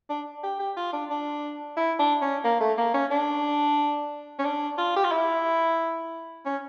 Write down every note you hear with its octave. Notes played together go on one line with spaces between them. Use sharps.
D4
G4
G4
F4
D4
D4
E4
D4
C#4
A#3
A3
A#3
C#4
D4
C#4
D4
F4
G4
F4
E4
C#4